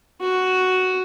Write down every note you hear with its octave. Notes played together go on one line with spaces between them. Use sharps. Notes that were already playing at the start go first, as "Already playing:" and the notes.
F#4